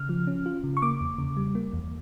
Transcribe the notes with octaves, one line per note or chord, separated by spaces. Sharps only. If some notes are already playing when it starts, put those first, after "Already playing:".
Already playing: C#3 F6
F3
C#4
F4
C#3
C#6
A#3 D6
E2
C#3
G3
A#3
E2